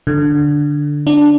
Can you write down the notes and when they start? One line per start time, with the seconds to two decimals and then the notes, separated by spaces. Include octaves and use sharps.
0.07 D3
1.07 D4